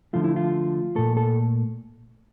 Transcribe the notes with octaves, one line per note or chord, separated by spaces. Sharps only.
D3 F3 A3 F4
E4
F4
A#2 A3 A4
A4